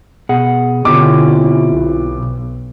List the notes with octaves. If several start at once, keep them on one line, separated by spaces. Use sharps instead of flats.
B2 G#4 F#5
B2 D3 C4 C#4 E4 F4 G4 D6
B1